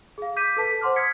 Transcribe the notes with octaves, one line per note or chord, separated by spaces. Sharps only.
G#4 F5
D6 G6 B6 D#7
A4 B4 A5 B6
C5 F#5 C6 D6 F6
D#6 F6 G#6 B6 C#7